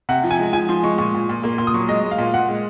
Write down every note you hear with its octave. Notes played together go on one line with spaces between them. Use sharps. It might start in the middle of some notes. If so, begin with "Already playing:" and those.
C3 F#5
F3
G#5
G#3
F3 G#5
F3 C6
G#3 C#6
A#2 C#6
A#2
A#2
A#3 C6
A#2 C6
D#6
F#3 C#6
G#3 D#5
G#3
F5
A#2
A#2 F#5
G#3